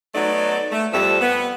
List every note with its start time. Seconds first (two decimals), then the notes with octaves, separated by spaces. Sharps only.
0.14 F#3 A3 B3 D#4 D5
0.72 A3
0.92 F2 F3 G3 A4 E5
1.21 B3